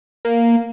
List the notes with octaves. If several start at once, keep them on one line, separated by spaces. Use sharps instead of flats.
A#3